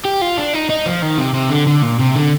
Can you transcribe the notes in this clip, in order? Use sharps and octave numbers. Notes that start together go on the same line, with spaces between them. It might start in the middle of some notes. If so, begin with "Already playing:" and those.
G4
F4
D4
D#4
D#4
F3
D#3
C3
C3
D3
D3
A#2
C3
D3